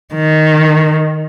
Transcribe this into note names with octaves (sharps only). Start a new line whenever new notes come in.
D#3